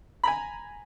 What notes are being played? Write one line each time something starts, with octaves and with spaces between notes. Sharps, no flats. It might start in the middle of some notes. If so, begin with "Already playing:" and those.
G#5 A#5 B5